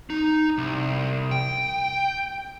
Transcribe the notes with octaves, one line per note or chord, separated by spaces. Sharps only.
D#4
C2
G5